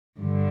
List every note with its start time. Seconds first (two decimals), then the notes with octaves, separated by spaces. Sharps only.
0.19 G2 D3